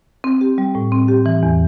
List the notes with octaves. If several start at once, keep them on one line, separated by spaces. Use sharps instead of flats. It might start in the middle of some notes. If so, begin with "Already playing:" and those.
C4
G4
G3
A2
C4
G4
E3
E2